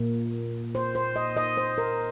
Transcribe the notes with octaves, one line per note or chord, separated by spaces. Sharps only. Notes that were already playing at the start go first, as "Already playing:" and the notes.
Already playing: A#2 A#3
C5
C5
D#5
D#5
C5
A#4